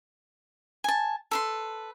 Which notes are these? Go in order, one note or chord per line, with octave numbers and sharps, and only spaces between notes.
G#5 A5
A4 B4 C6